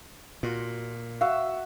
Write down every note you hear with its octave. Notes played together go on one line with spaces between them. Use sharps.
A#2 F4 F#4
F#4 E5 F5